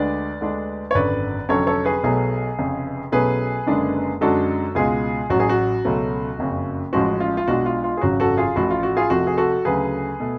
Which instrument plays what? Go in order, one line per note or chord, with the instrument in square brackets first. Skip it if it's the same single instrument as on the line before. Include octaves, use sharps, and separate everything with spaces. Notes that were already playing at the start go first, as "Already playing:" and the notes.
Already playing: [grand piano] D2 D3 G#3 D4 B4 D5
D2 D3 G#3 D4
C#5
G#1 F#2 D3 B4 D5
F1 F2 D3 F#3 C#4 A4 C#5
A4 C#5
G#4 B4
B1 B2 F#3 A3 G#4 B4
F1 F2 C#3
B1 B2 F#3 A3 C#4 G#4 B4
F#1 F#2 D3 G#3 D4
F#2 D3 G#3 D4 F#4 A4
C#2 B2 G#3 F4 G#4
A1 A2 F#3 F#4
G#4
F#4
C#2 B2 F#3 A3 C#4
F#1 F2 C#3
A1 A2 F3 G#3 C#4 F#4
F4
F4
B1 B2 G#3 D4 F#4
F4
F4
G#4
G#1 F#2 C#3 F#3 F#4
F#4 A4
F4 G#4
A1 A2 F3 F#4
F4
F#4
F4 G#4
F1 F2 F3 A3 F#4
G#4
F#4 A4
D2 C#3 F#3 A3 G#4 B4
B2 A3